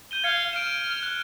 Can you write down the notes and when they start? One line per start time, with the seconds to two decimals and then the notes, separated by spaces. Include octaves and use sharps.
0.11 G6 D#7 G7
0.24 F5 G#6 C#7
0.53 F6 D7 E7
1.03 F#6